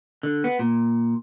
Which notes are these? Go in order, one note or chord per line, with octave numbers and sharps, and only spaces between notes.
D3
B3
A#2